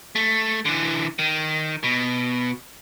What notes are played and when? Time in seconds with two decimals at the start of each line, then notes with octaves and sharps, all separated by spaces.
0.15 A3
0.65 D3 E3
1.19 D#3
1.84 B2